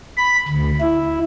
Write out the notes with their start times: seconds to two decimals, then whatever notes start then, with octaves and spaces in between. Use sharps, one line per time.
0.17 B5
0.48 D2
0.81 E4